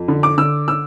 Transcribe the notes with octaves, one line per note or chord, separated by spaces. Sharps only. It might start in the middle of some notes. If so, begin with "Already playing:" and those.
Already playing: F2
D3
D6
D3 E6
E6